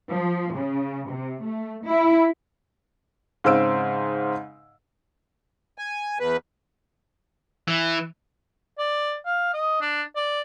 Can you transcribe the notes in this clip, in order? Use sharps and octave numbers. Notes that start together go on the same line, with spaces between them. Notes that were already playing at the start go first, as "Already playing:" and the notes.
F3
C#3
C3
A3
E4
G#2 C#3 C4 E6 D7
G#5
E2 B4
E3
D5
F5
D#5
D4
D5